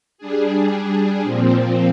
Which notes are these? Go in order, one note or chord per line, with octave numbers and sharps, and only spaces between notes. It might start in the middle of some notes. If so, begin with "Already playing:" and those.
G3 D4 G#4
A#2 F3 C4